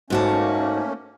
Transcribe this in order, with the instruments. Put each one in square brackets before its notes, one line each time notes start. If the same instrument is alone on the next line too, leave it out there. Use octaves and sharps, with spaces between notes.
[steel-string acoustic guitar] G#2 F#4 A5 [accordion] A3 A#3 C#4